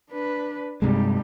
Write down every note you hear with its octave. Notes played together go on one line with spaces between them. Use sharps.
D4 B4
G2 C3 G3 G#3 D#4